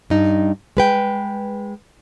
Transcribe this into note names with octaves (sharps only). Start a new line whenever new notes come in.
G2 D#4
G#3 B4 G5